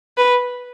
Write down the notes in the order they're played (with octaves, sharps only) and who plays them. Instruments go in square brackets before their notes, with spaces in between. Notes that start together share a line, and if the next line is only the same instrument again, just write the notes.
[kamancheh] B4